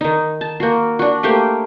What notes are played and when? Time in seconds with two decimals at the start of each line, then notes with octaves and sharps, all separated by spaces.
0.01 D#3 D#4
0.41 A5
0.60 A#3 F#4
0.99 D4 F#4
1.23 A3 A#3 G4 C5